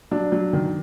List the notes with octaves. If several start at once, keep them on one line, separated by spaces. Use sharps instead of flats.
F#3 D4
F#3
D#3